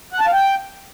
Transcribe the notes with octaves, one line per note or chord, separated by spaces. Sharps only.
F#5
A5
F5
G5